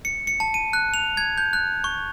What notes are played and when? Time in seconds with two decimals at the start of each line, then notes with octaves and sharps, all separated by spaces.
0.05 C#7
0.27 C#7
0.40 A5
0.54 D#7
0.73 F#6
0.94 F7
1.17 G#6
1.38 G6
1.53 F#6
1.84 C#6